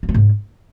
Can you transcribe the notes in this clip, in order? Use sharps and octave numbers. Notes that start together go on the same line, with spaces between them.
A#3
A3
G#2